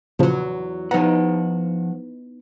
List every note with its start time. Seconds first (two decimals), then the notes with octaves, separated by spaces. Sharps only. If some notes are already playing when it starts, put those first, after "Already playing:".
0.19 E2 A#2 C#3 F3 F#3
0.91 F3 B3 D#4 F#5 A#5